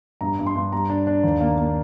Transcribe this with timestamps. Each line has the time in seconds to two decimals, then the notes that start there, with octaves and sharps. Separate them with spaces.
0.21 G2 A#5
0.39 G2
0.46 C6
0.55 G2
0.73 G3 A#5
0.89 D4
1.07 D4
1.23 D#2
1.40 A#3
1.58 A#3